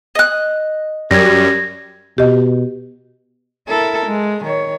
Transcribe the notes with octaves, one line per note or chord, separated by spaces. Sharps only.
D#5 F#6
F#2 G3 G#6 A#6
B2 G4 D#5
E4 A4 A#4
G#3
D#3 C#5